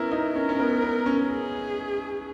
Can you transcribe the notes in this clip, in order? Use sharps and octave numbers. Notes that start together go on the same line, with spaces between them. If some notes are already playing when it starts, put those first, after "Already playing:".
Already playing: B3 C#4 E4 A#4
D#4
C#4 A#4
C#4
B3
B3
C#4
G#4